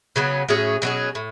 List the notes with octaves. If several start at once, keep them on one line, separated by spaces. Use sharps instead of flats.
C#3 F#3 B3
A2 F#3 C#4 G#4
B2 F#3 C#4 G#4
A2